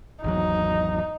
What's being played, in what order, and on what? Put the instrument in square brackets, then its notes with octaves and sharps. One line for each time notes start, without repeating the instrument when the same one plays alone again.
[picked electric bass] G#1 E2 F#3 [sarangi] D#4